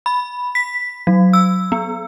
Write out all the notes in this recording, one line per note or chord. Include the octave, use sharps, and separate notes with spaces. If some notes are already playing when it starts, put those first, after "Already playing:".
B5
B6
F#3
E6
B3